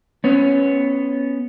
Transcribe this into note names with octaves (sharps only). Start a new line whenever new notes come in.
B3 C#4